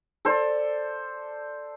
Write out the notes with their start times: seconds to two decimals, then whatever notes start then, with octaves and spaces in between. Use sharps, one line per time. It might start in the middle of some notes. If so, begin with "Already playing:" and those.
0.25 A4 C5 D5